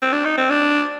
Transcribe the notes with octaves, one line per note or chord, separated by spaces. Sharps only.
C4
D4
D#4
C4
D4